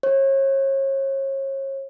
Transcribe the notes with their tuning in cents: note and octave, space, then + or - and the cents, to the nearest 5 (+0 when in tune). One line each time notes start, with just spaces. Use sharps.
C#5 -35